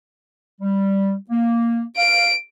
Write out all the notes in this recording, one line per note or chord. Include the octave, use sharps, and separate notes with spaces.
G3
A#3
F5 D7